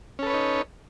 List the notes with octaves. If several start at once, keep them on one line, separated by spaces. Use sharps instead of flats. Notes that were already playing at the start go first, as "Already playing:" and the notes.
C#4 D#4 A4 B4 C#5